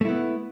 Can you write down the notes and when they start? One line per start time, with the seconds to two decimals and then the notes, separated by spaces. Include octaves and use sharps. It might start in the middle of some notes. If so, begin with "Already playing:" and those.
0.01 A3
0.05 E4
0.09 B3